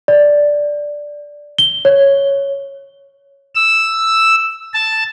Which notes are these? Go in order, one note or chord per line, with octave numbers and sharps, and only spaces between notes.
D5
G7
C#5
E6
A5